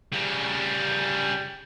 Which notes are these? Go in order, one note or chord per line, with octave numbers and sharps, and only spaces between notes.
C#3 G3